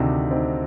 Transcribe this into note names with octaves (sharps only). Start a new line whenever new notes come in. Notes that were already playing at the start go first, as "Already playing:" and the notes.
Already playing: D2 C3 D#3 D4
C4 D#4